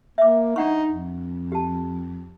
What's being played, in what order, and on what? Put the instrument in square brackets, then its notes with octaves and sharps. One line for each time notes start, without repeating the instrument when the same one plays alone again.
[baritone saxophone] A#3 [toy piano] E5 D6
[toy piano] D4 F#5 C#6 [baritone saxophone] D#4
[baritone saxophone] F2
[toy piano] G4 A5